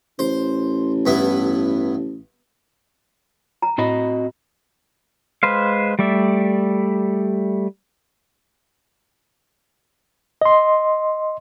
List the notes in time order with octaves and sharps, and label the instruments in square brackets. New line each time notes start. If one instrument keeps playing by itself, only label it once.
[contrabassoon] A1 [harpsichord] C5
[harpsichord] G2 B3 E4
[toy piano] A#5
[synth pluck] A2 B5 [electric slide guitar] C4 F#4 D#5
[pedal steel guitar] G#3 B4 C5 F5
G3 A3 D5 E5
[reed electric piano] D#5 C6